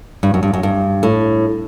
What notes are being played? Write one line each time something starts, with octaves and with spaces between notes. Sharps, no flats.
G2
F#2
G2
F#2
G2
A2